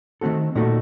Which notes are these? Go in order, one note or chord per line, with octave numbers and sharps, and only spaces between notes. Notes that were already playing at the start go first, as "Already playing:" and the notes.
D#3 A3 C4 F#4 A4
A#2 A3 D#4 F#4 A4